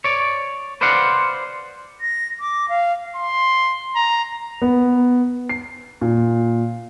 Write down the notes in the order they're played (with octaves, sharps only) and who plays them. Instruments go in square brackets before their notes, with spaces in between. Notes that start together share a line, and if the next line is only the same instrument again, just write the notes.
[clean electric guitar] C#5 D5
B4 C5 D5 F5 F#5
[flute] A#6
D6
F5
[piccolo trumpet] C6
A#5
[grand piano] B3
C7
A#2